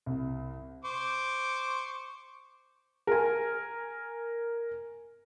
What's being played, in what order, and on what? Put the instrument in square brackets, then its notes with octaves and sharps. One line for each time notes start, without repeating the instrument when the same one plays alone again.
[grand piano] C2
[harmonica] C5 C#6 D6
[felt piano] A#4 G#5